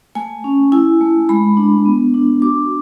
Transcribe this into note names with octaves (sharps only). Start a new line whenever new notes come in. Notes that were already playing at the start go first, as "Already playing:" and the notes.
A3 G#5
C#4
E4 G#5
A3
G#3 B5
D4
B3
D4
F#4 D6